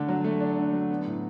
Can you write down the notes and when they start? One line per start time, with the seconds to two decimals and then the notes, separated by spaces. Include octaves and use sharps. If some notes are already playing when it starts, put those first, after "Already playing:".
Already playing: D3 A3 D4
0.08 F#3
0.24 A3
0.40 D4
0.58 D3
0.73 F#3
0.90 B3
1.06 A2